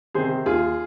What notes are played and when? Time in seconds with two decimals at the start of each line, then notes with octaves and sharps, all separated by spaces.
0.14 C3 D#3 G#4 C5
0.46 D#2 F4 G#4